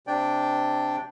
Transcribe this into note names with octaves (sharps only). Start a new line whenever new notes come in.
C3 D4 D5 G5